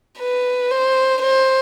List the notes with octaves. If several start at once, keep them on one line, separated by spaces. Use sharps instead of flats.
B4
C5
C5